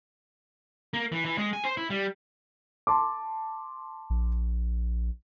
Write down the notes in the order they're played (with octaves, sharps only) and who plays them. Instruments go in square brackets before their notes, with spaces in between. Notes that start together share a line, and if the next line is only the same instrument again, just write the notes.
[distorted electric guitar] A#3
E3
E3
G#3
G#5
C5
E4
G3
[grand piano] A5 C6 D6
[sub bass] A#1